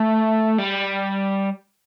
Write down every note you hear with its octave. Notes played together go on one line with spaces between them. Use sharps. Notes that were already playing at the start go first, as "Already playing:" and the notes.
Already playing: A3
G3